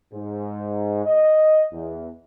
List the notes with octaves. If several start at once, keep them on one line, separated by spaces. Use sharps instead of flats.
G#2
D#5
E2